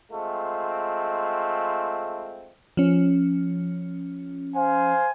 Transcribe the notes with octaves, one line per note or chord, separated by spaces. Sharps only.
G#3 A3 C4 F4
F3 C#4
C5 F5 G#5